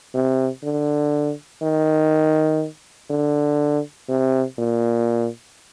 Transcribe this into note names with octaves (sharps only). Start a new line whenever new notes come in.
C3
D3
D#3
D3
C3
A#2